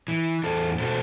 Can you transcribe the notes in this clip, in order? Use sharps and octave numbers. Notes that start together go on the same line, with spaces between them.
E3
E2 A4 C5
B2 A4 C5